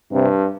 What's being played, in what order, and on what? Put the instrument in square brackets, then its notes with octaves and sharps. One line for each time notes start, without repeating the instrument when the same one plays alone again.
[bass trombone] G2 [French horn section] C3